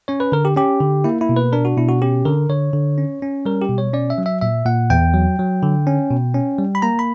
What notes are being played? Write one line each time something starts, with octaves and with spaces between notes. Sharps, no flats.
C#4 C#5
B4
D3 A#4
G4
C#4 G4
D3
A#3 E4
E4
B2
B4
D4 A#4
F#4
B2 E4
F#4
C#4 G4
D3 A#4
D3 C#5
D3
C#4
C#4
G3 A#4
G4
B2
C#5
C#4 D5
E5
F#3
E5
A#2 E5
A#2 F#5
E2 G5
F#3
F#3
D3
C#4
B2
C#4
G3
B5
A#3 A#5
B5